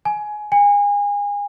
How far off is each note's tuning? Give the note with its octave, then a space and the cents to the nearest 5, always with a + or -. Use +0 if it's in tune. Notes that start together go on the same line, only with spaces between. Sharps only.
G#5 +15
G#5 -30